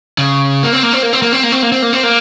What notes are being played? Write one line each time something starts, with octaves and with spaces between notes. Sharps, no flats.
C#3
A#3
C4
A#3
C4
A#3
C4
A#3
C4
A#3
C4
A#3
C4
A#3
C4
A#3